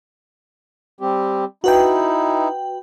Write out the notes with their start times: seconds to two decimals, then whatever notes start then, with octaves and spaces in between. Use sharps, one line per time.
1.01 G3 C4 G4
1.64 D#4 E4 F#4 B4 G5